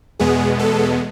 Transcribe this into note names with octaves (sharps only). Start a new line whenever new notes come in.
E2 B2 G#3 B3 G#4
A4